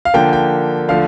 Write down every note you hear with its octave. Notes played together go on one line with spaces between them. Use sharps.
F5
D3 F3 A#3 G5
G5
D3 F3 A3 F5